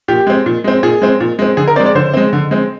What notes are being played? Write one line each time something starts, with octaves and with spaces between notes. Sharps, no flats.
A#2 G4
G#3 C4
A#2
G#3 C4
A#2 G#4
G#3 C4
A#2
G#3 C4
D3 G#4
A#4
G#3 C4 D5
D5
D3 C5
G#3 C4
D3
G#3 C4